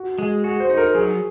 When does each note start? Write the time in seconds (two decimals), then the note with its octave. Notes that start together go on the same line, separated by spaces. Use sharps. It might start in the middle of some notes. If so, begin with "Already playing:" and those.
Already playing: F#4
0.18 G#3 G#4
0.44 F#4 G#4
0.60 C5
0.70 D#4
0.77 A#4
0.94 F#3 G#4